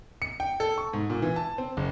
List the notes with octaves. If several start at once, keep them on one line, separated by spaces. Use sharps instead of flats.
C#7
G5
A4
C#6
G#2
A#2
E3
A5
C4
F#1